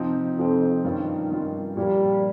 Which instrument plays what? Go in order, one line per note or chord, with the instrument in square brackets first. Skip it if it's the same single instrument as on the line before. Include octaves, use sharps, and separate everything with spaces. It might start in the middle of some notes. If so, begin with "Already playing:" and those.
Already playing: [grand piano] C3 F3 C4 D#4
[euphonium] F2 [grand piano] C3 F3 C4 D#4
[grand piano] G2 G3 C#4 F4 [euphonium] D#3
[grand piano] G2 G3 C#4 F4
[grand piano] A#2 F3 A#3 [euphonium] G3